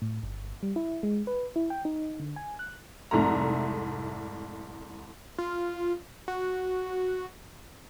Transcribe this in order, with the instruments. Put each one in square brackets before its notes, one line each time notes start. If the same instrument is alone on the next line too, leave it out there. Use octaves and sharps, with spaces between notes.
[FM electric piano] A2
G1
G3
E4
G#3
B4
E4
G5
D#4
D3
G#5
F#6
[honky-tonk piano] F1 C2 G#2 A3 A#5
[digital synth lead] F4
F#4